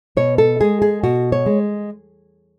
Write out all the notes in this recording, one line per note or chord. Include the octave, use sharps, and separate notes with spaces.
B2 C#5
A4
G#3 G#4
G#4
B2 F#4
C#5
G#3